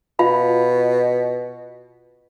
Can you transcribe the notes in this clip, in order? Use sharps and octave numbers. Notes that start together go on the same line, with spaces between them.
B2 F4 F5 B5